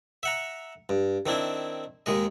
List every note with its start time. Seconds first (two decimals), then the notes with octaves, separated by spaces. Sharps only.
0.23 E5 F#5 A#5
0.89 G2
1.26 D#3 C4 D4 E4
2.06 D#2 D#3 G#3 D#5